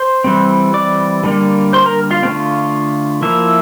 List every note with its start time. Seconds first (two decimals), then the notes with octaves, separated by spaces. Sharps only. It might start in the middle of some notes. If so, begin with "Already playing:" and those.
Already playing: C5 C6
0.24 E3 G3 C4
0.74 D5 D6
1.24 D3 G3 A#3
1.73 C5 C6
1.86 A#4 A#5
2.11 F4 F5
2.23 D3 A3 C4
3.22 F3 A#3 E4 E5